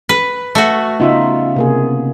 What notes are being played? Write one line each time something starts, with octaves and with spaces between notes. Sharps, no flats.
B4
A3 F#4
C#3 B3 D#4 F4 E5
C3 A#3 G#4